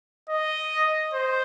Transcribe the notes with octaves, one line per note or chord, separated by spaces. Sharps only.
D#5
C5